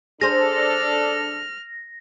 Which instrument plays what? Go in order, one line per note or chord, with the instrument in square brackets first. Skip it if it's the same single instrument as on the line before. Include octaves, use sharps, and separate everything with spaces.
[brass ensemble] D4 A4 [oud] G#4 C5 [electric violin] F6 [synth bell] A#6